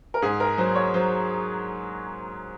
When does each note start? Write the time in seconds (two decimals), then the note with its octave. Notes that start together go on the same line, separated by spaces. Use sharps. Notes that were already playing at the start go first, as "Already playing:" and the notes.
0.14 A#4
0.22 G#2 G#4
0.40 A#4
0.58 F#3 C5
0.75 C#5
0.94 F#3 C5